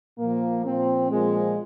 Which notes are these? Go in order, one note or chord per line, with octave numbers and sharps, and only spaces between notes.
A#2 F3 A#3
A#2 F3 C4
A#2 F3 G#3